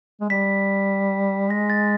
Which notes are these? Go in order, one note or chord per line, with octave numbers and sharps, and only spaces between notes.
G#3
G3 B6
G#3 A#6
A6